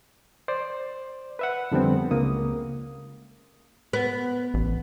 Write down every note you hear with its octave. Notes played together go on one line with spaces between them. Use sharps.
C5 D5
B4 E5 F#5
F2 D3 G3 B3 C4
C#2 A#3 D#6
B3
A1